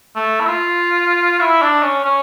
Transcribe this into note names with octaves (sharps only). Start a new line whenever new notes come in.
A3
E4
F4
E4
D4
C#4
C#4